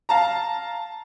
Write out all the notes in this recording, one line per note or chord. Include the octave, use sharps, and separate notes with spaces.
F5 A5 A#5